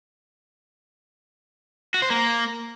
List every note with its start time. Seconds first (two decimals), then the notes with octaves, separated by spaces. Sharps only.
1.94 F#4
2.02 C5
2.10 A#3